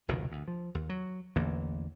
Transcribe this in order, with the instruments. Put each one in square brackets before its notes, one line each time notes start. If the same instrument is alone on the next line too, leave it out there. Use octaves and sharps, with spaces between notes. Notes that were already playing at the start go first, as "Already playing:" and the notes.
[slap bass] F1 C#2 B2 D#3
D2
F3
D#2
F#3
A1 E2 D3 A#3